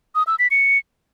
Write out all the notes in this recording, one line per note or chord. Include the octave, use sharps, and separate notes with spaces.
D#6
E6
B6
C#7